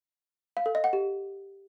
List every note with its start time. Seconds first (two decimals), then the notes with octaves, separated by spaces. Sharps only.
0.57 F5
0.66 A4
0.75 D#5
0.84 F#5
0.93 G4